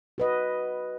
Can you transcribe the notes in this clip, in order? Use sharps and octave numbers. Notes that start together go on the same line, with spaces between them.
F#4 B4 D#5